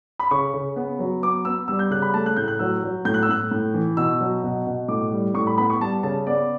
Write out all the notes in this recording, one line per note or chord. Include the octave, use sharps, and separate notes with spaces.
B5
C#3 C#6
C#3
B3
F#3
B3 D6
B3 E6
G3 E6
G6
C#3 F#6
B5
A3 A5
F#6
A2 G6
F#6
F#3 E6
F#3
A2 G6
F#6
E6
A2 F#6
A2
E3
B2 E6
F#3
B2
B2
A2 D6
G3
A2 C#6
B5
B3 B5
C#6
G3 A5
C#3 A5
B3 D5